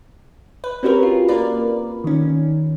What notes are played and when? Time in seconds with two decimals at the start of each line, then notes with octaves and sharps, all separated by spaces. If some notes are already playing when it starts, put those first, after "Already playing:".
0.64 B4
0.83 C4 C#4 F#4 G4 A#4 B4
1.03 F4
1.28 A#3 A#4 B4 D5
2.04 D#3 C#4